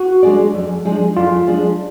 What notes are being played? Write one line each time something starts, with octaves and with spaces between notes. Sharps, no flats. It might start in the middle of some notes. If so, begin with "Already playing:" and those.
Already playing: F#4
G#3 D4 G#4 D5
F2
F3 G#3 D4 G#4
F2 F4
F3 G#3 D4 G#4